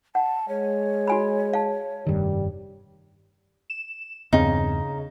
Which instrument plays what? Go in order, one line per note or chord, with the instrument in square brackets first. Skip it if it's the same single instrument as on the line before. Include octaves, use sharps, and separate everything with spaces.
[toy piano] F#5 [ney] A5
[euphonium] G#3 [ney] C#5
[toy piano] F#4 G#5 B5
F5 A5
[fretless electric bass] F1 G2 D#3 [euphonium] G3
[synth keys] E7
[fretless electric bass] E2 G2 C4 [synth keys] C#3 [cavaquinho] D#4